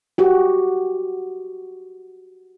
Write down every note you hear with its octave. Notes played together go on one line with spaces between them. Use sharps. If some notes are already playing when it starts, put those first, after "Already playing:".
F#4 G4